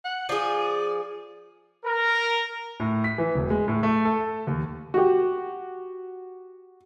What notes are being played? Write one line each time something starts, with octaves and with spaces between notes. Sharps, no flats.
F#5
F3 G#4 D5
A#4
A2
B6
E3
E1
G#3
A2
A3
A4
D#2
F#4 G4